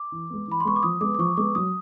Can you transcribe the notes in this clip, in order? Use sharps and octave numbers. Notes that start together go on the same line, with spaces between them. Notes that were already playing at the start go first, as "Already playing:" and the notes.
Already playing: D6
E3
G#3 B3
E3 B5
C6
G#3 B3 C#6
D6
F3 D#6
G#3 B3 D6
D6
F3 C#6
G#3 B3 D6
F#3 D#6